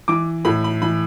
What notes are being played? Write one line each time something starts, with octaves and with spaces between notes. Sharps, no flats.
E3 D6
A2 B5
B5
E3 B5